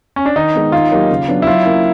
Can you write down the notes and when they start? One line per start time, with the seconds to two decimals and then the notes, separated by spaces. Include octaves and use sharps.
0.16 C#4
0.26 D4
0.36 D#3 D#4
0.55 G#3 B3
0.72 D#3 F4
0.92 F#3 A#3 D#4 G4
1.10 C#3
1.28 F#3 B3 D4
1.42 E4
1.47 F#3 F4
1.65 A#3 C#4 E4